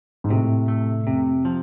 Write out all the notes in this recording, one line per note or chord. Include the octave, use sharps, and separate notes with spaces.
G#2
A2 C3
A3
F2 C3
F3